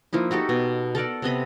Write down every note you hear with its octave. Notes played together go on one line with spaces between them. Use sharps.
F3 A#3 D#4 E4
D#4 F#4 G4 A4
B2
A4 A#4 D5 F#5
C3 B3 D#5 B5